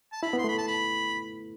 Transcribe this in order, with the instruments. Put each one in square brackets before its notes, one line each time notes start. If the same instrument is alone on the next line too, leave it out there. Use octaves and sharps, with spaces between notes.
[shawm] A5
[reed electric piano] E4 [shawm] B5
[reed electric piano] B3
[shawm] C6
[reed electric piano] A3 [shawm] B5
[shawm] A5
B5